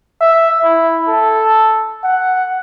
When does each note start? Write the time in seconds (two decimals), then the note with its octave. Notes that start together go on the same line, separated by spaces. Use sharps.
0.21 E5
0.65 E4
1.08 A4
2.04 F#5